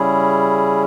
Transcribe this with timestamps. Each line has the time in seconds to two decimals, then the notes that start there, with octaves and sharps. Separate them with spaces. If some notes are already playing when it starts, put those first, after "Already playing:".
Already playing: C#3 G3 C#4 E4 G#4